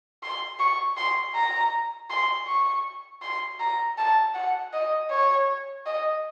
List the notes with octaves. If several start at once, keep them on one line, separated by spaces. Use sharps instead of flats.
C6
C#6
C6
A#5
C6
C#6
C6
A#5
A5
F#5
D#5
C#5
D#5